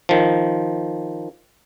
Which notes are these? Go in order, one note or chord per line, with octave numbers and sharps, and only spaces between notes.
D#3 F3